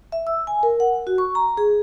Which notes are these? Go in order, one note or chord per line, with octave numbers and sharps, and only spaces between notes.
E5
E6
G#5
A#4
F#5
F#4
C#6
A#5
G#4